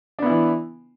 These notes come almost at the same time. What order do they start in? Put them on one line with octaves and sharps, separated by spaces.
D4 B3 E4 E3